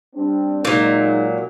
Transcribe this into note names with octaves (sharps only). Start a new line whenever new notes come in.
G3 C4 D4
A#2 F#3 G#3 D#4